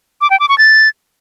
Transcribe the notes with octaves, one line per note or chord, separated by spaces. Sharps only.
D6
G5
D6
C#6
A6